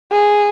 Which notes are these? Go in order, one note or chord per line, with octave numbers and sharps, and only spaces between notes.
G#4